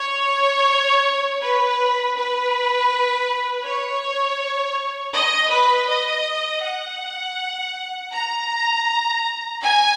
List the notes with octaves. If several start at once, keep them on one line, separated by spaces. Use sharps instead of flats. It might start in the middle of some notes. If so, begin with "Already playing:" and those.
Already playing: C#5
B4
B4
C#5
D#5
B4
D#5
F#5
A#5
G#5